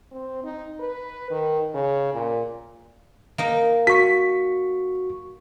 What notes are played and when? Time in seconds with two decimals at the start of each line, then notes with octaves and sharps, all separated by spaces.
0.11 C4
0.44 D#4
0.80 B4
1.31 D#3
1.74 C#3
2.13 A#2
3.38 A#3 D#4
3.87 F#4 C#6 B6